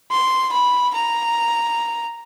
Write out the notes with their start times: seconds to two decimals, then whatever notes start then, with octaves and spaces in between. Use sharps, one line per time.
0.12 C6
0.53 B5
0.94 A#5